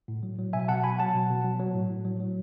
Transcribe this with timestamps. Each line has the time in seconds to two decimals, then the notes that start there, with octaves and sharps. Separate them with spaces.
0.08 A2
0.23 F#3
0.38 F#3
0.53 B2 E5 G#5
0.68 B2 F#5 A5
0.84 F#3 G#5 B5
0.99 F#3 F#5 A5
1.14 B2
1.30 B2
1.44 F#3
1.59 F#3
1.74 A2
1.90 A2
2.05 F#3
2.20 F#3